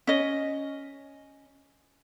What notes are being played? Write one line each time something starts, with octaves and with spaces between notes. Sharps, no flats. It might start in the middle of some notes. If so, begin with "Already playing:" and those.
C#4 D#5